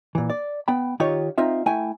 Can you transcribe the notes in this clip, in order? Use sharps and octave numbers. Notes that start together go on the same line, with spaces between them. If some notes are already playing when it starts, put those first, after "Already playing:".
A#2 E3
D5
B3 G5 B5
D#3 D#4 F4 G4 C#5
C4 D#4 F4 E5
A3 E4 G5 G#5